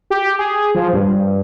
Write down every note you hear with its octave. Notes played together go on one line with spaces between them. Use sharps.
G4
G#4
F3
G2